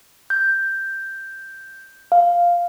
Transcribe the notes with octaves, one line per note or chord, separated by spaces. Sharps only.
G6
F5